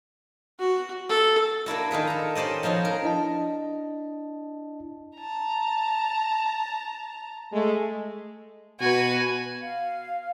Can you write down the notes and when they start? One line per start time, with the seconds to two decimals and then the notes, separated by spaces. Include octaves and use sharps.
0.59 F#4
1.09 A4
1.66 A#3 D4 E4 F#4
1.91 D#3 F4 G#4 B4
2.07 A4 A#5
2.35 C#4 G4 C5 D5 D#5
2.63 F3 B3 D#4 F#4 C#5
2.85 A#4
3.03 D4 E4 D#5 A5
5.17 A5 A#5
7.52 G#3 A3
8.81 B2 F#4 B4 G#5
9.62 F5